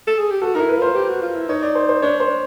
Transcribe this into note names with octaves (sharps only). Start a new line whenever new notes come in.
A4
G#4
G4
F#4 A4
D#4 A#4
E4
B4
F4 C5
G4
F#4
F4
E4
D#4 C#5
D5
C5
C5
D4 C#5
C5
D4